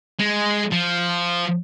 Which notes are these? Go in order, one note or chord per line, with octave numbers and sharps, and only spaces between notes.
G#3
F3